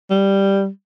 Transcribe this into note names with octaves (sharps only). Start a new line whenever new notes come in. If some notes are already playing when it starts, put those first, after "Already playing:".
G3